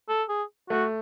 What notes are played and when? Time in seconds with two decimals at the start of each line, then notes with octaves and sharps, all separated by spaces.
0.09 A4
0.29 G#4
0.70 A3 F#4